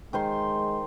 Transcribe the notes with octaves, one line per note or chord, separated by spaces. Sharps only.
D#3 G#3 C5 C6